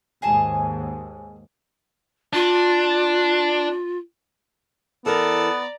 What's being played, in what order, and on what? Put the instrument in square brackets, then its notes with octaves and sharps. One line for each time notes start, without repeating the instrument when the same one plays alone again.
[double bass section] D#2 G#2 [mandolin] G#4 G#5 A5
[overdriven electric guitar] D4 [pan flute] F4
[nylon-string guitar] E3 A#4 [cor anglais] B3 [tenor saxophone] A4 [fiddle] D5 A#5